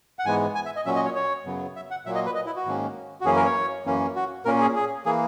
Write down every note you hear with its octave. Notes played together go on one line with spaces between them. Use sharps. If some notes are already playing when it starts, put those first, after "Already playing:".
F#5
G#2 E3 G#3 B3 G#5
G#5
E5
D#5
A#2 F#3 C#4 E5
D#5
C#5
C#5
F#2 C#3 F#3 B3
E5
F#5
A#2 F#3 A#3 E5
D#5
B4
D#5
E4
F#4
G#2 D#3 A#3 C#4
F#4
F#2 E3 A#3 C#4 G#4
A#4
C#5
F#2 E3 A#3 C#4
F#4
A#2 A#3 C#4 A#4
G#4
G#4
E3 A#3 G#4